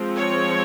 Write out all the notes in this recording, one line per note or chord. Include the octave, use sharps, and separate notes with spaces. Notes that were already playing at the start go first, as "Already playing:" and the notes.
Already playing: F3 G#3 C4
C#5